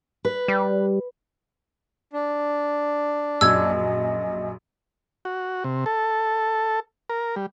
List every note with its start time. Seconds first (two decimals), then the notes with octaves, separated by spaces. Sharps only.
0.25 B4
0.48 G3
2.13 D4
3.41 A#1 F#2 D#5 E6 G#6
5.25 F#4
5.64 C3
5.86 A4
7.10 A#4
7.36 G3